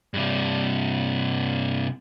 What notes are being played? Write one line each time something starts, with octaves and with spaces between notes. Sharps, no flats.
G2 C3